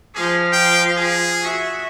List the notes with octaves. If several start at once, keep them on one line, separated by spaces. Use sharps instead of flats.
F3 G#4 F5
G5
G#4
F#4 E5